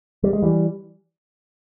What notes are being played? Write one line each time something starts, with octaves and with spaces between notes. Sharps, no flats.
G3
G#3
E3 G3